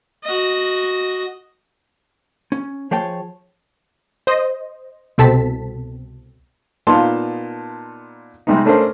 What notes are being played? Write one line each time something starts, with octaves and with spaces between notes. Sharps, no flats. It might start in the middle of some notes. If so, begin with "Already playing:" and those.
F#4 D#5
C#4
F3 G#4 C#5 G5 A5
C5 D#5
C2 B2 C4 A4 A5 B6
A#2 B3 D#4 F5 A5 C6
C3 G3 G#3 B3 D#4
A3 C#4 D4 A4 A#4 C5